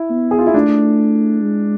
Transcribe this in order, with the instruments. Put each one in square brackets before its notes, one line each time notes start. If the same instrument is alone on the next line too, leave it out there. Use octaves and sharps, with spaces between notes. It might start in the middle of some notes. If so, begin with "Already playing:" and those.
Already playing: [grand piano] E4
[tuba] B3
[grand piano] G#4
F4
E4
[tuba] A3 [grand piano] D4
[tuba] G#3